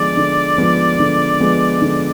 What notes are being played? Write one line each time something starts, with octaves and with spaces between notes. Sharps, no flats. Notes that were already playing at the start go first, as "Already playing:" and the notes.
Already playing: D3 F3 G#3 B3 D5
D3
F3 G#3 B3
D3
F3 G#3 B3
D3